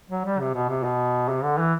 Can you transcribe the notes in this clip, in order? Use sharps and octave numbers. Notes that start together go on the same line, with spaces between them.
F#3
G3
C3
B2
C3
B2
C3
D3
E3